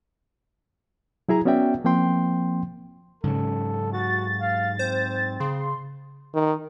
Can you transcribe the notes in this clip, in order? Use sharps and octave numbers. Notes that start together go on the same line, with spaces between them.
F#3 E4 G#4 A#5
B3 C#4 F#4 D5 E5 G5
F3 A#3 C4 G5 C6
G#2 C#3 F#3 A4
F#4 A6
F5
C4 C5
C#3 C6
D#3